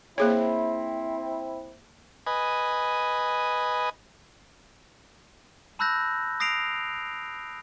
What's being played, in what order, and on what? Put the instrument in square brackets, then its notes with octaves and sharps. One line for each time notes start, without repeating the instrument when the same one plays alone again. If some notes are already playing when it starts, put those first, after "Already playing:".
[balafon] A#3 G#4 C#5 [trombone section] C4 E4
[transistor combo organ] B4 D#5 G#5
[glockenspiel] A5 B5 E6 F#6 G6 A#6
D#6 A#6 C7 D7 F7